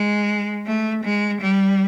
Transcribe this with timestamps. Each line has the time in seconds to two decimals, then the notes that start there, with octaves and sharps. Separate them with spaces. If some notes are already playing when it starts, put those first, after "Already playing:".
Already playing: G#3
0.66 A3
1.04 G#3
1.41 G3